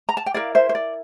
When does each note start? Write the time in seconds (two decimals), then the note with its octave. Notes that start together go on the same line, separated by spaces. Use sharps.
0.09 A#5
0.17 A5
0.26 G5
0.34 E4 A#4 D5 F5
0.55 C5 E5
0.69 C5
0.75 D5